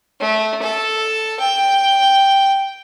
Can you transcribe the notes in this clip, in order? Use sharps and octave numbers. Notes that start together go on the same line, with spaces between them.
A3
A4
G5